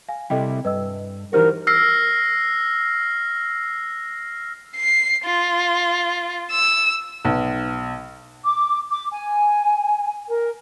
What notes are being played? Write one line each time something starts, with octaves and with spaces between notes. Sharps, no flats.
F5 G#5
C3 G3 E4 A4 D#5 G5
G2 B4 D#5 E6
E3 D#4 F#4 G4 A#4 C5 F6
E6 F6 A#6 C7
C7
F4
E6
B1
D6
D6
G#5
A#4